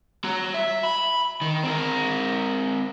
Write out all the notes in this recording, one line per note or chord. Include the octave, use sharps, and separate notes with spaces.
F#4 A#5
E5
B5
D#3
C4 A#4